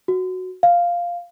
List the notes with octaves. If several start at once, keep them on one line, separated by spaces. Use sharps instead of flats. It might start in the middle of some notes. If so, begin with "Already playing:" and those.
F#4
F5